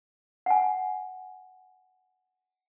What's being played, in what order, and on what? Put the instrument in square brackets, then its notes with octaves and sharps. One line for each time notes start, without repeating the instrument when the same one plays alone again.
[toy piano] F#5 G#5